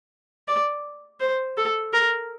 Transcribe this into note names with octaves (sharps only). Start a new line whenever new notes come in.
D5
C5
A4
A#4